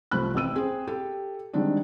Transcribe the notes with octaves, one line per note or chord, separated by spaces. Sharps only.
C2 F3 A3 C5 B5 F#6
A1 C4 E6 D#7
C4 G#4 C5
G4 A4
D3 D#3 G3 G#3 C4 D4